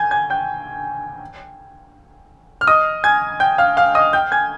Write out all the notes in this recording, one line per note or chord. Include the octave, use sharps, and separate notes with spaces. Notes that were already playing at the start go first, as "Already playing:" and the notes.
Already playing: G#5 G6 G#6
G#5 G#6
G5 G6
F6
D#5 D#6
G#5 G#6
G5 G6
F5 F6
F5 F6
D#5 D#6
G5 G6
G#5 G#6